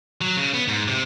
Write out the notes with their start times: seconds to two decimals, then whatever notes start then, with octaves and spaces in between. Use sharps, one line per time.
0.21 F#3
0.36 C#3
0.54 B3
0.68 G#2
0.88 C3